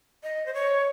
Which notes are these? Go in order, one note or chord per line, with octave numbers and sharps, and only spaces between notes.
D#5
C5
C#5